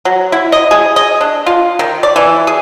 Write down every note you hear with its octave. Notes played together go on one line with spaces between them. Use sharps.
F#3
E4
D#5
G#4
D#5
D4
F4
D#3
D5
E3
G#4